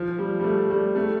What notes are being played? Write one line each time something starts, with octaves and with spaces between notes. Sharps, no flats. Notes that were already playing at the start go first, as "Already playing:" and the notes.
Already playing: F3
G3
G3
A3
G3
A3